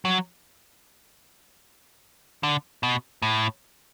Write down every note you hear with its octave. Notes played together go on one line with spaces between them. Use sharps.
F#3
D3
B2
A2